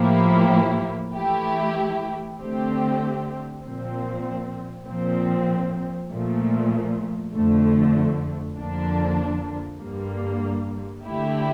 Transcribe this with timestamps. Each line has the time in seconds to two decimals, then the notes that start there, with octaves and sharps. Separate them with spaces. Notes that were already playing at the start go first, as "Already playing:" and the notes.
Already playing: A2 F3 A#3 E4 G4
1.15 E3 A3 E4 G4
2.38 D3 A3 C4 G4
3.62 A#2 F3 C4
4.86 A#2 F3 C4
6.10 A#2 F3 A3
7.33 F2 D3 A3
8.57 F2 D3 F3 A#3 D4
9.81 G2 D3 G3 A#3
11.05 D3 A3 E4 G4